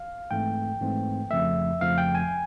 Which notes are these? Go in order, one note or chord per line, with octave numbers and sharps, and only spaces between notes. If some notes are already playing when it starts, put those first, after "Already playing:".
Already playing: F5
G#2 E3 A3 C4 G5
G#2 E3 A3 C4
F2 C#3 F3 A3 E5
F2 C#3 F3 A3 F5
G5
G#5